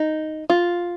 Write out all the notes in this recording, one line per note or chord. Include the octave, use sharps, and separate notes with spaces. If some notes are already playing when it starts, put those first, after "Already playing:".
Already playing: D#4
F4